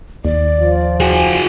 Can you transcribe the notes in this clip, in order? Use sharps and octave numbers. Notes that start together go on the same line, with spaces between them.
D#2 D5
F3 F4
F#4 G#4 G#5